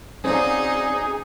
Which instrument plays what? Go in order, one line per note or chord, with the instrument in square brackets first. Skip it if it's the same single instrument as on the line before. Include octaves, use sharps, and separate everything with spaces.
[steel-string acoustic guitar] C4 F#4 F5 [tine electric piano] C#4 D5 [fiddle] D#4 [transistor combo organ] G#4